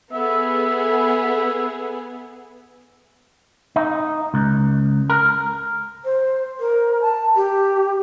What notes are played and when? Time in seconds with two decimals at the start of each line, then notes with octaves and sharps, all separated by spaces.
0.13 B3 G#4 A4 E5
3.76 D#4
4.34 C#2
5.10 A#4
6.04 C5
6.60 A#4
7.02 A5
7.36 G4